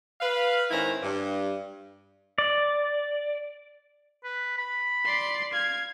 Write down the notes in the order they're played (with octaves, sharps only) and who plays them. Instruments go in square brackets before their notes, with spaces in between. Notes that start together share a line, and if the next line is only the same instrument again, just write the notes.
[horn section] B4 F5
G#2 D#3 C#4 E4 C5 A#5
G2
[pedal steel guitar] D5
[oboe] B4
B5
[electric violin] D5 C6
[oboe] F5 [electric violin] G#6